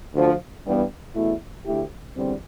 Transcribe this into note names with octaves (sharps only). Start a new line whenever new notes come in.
D2 D3 F3
G2 E3 G3 B3
E2 B2 A3 E4
D2 D3 A3 E4 G4
E2 D3 G3 C4